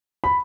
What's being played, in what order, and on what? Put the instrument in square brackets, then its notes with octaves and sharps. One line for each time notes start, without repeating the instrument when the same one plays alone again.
[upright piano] B5